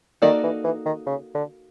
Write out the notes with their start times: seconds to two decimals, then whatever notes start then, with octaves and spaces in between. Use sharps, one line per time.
0.22 D#3 A#3 D#4 F#4 A4 D5
0.43 E3
0.64 E3
0.86 D#3
1.07 C#3
1.35 D3